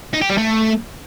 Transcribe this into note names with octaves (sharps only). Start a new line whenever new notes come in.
D#4
G4
G3
A3